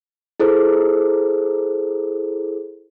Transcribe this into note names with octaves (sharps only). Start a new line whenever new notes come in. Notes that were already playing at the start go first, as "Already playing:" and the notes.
E4 G#4 A4 C5